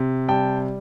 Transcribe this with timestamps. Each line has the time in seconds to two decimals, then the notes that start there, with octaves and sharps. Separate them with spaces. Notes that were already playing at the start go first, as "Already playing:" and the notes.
Already playing: C3
0.28 G3 G5 A5